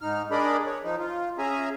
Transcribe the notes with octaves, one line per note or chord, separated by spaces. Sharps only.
G#2 D#4 F6
D4 G#4 A#4 D5 D#5 B5
C#5
F3 D#4
F4
C#4 G#4 E5 G#5 A#5